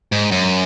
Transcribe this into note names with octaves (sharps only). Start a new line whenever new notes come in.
G#2
F#2